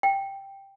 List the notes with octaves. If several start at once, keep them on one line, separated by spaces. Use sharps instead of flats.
G5